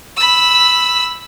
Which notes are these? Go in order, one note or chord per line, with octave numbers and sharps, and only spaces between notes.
B5 E6